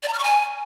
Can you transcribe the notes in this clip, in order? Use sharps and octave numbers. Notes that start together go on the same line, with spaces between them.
D5
A#5
F6
C#6
G#5